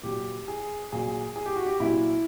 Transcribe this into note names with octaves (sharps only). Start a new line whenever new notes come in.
A#2 F#3 G4
G#4
A#2 F#3 G#4
G#4
G4
F#4
G4
A#2 F#3 E4